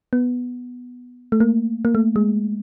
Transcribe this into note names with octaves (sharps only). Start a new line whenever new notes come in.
B3
A3
A#3
A#3
A3
G#3